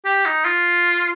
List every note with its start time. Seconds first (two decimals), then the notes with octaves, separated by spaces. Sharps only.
0.05 G4
0.26 D#4
0.45 F4